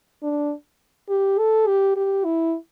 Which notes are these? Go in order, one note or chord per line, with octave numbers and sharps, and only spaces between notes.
D4
G4
A4
G4
G4
E4